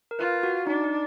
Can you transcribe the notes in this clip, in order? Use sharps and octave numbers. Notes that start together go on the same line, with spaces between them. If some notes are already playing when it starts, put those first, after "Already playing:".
A#4
F4 B4
F#4
D4 D#4
D#4